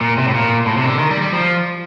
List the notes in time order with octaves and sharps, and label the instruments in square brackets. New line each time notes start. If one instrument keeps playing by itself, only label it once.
[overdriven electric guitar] A#2
C3
A2
A#2
A2
C3
D#3
D3
D#3
G3
G3
F3